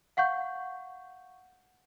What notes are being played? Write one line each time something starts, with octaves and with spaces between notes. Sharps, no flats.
F5 F#5 C#6 G6